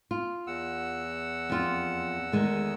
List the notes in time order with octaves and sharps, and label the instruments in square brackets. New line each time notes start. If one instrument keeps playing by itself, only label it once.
[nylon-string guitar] F4
[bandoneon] E2 F#5 E6
[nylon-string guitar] F2 F4
D#3 G#3 A3